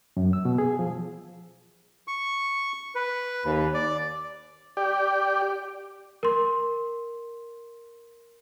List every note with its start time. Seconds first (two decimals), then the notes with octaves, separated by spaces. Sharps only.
0.17 F#2
0.33 E6
0.45 B2
0.58 G#4
0.79 F3
2.08 C#6
2.95 B4
3.45 D#2
3.74 D5
4.77 G4 D5
6.23 A#4 C6